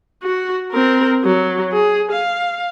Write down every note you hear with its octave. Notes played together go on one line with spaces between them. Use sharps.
F#4
C4 A#4
F#3
G#4
F5